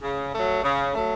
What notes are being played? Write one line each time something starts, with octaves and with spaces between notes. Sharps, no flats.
C#3
F#3 A3
C#3
F#3 A3